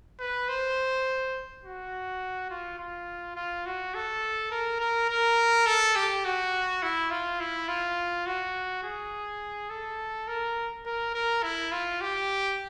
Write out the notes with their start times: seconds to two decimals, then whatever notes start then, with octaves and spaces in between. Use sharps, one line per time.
0.19 B4
0.48 C5
1.64 F#4
2.50 F4
2.78 F4
3.36 F4
3.66 F#4
3.94 A4
4.51 A#4
4.80 A#4
5.10 A#4
5.66 A4
5.95 G4
6.25 F#4
6.82 E4
7.10 F4
7.40 E4
7.68 F4
8.26 F#4
8.83 G#4
9.69 A4
10.28 A#4
10.85 A#4
11.14 A#4
11.43 E4
11.72 F4
12.01 G4